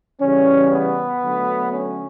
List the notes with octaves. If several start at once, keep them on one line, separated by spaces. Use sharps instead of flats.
C#3 E3 G3 C#4
B3
D3 F#3 A3
C#4